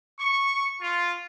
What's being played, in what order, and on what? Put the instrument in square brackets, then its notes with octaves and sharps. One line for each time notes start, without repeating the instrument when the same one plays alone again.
[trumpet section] C#6
F4